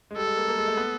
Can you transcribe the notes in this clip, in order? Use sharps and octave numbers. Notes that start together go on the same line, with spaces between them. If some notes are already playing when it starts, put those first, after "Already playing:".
G#3
G3 A4
G#3
A#3
A#3
G#3
A3
B3